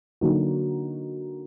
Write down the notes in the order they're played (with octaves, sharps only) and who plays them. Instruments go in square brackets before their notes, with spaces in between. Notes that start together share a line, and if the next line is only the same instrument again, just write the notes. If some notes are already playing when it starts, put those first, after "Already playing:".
[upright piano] D3 F#3 A#3 D#4 F#4